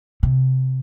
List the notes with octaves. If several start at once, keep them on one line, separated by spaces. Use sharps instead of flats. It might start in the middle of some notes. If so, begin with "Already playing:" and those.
C3